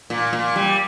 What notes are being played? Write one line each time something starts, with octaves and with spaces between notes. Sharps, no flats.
A#2
A#2
G3